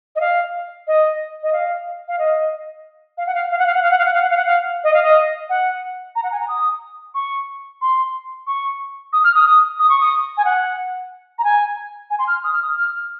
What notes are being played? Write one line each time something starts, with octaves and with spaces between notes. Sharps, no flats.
D#5
F5
D#5
D#5
F5
F5
D#5
F5
F#5
F5
F5
F#5
F5
F#5
F5
F#5
F5
F#5
F5
F#5
F5
F#5
F5
D#5
F5
D#5
F#5
A#5
F#5
G#5
A#5
D#6
C#6
C6
C#6
D#6
F6
D#6
D#6
D#6
C#6
D#6
G#5
F#5
A#5
G#5
G#5
C6
F6
D#6
F6
D#6
F6